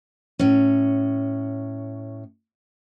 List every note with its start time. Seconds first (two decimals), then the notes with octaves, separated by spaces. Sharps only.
0.39 A2 C#4